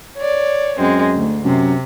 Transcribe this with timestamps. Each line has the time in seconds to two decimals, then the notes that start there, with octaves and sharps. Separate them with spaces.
0.17 C#5 D5
0.79 F#2 G#3 C4
1.14 D2
1.44 F#2 C3